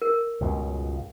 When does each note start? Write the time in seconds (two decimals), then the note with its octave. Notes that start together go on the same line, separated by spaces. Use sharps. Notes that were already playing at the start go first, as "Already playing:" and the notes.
0.02 A#4
0.41 C#2 G2 B2